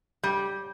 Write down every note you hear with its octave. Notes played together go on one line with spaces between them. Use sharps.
G3 G6